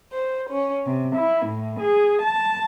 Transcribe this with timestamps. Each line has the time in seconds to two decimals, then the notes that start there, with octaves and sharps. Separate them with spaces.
0.11 C5
0.50 C#4
0.86 C3
1.16 E4
1.47 A2
1.81 G#4
2.22 A5